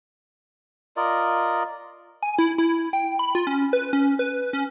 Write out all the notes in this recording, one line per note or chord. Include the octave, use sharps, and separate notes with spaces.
F4 A#4 D5 D#5
G#5
E4
E4
G5
B5
F4
C#4
B4
C#4
B4
C#4